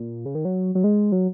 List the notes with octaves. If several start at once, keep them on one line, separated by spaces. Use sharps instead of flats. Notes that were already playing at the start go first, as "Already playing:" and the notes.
Already playing: A#2
C#3
D#3
F#3
F#3
G#3
F#3